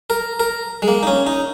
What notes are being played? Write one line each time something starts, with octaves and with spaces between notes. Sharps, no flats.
A#4
A#4
G#3
A#3
D#4
C#4
D#4